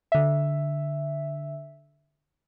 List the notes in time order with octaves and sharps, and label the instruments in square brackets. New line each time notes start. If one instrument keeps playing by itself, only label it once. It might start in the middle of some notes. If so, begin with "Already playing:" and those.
[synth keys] D3 E5